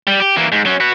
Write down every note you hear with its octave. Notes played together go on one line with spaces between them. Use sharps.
G3
G4
E3 A#3
G#2
F#3 C#4
F#4 B4